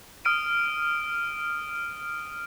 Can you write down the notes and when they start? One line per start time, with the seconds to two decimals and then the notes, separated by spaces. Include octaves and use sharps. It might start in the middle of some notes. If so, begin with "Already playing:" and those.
0.25 D#6 F6 D7 D#7